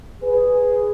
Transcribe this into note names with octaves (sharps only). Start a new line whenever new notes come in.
G#4 B4